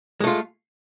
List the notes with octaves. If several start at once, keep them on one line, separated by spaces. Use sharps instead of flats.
G#3 A3 F4